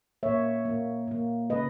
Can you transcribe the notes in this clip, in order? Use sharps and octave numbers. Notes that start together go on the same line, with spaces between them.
A#2 A#3 C#5 E5
A#2 A#3
A#2 A#3
C#3 G#3 B4 D#5